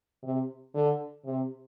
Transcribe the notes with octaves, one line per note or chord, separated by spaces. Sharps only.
C3
D3
C3